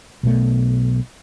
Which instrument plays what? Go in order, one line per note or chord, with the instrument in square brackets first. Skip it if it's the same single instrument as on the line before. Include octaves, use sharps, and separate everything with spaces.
[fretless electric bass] B1 B2 A3